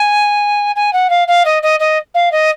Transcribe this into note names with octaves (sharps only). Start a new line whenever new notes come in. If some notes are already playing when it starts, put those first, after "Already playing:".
Already playing: G#5
G#5
F#5
F5
F5
D#5
D#5
D#5
F5
D#5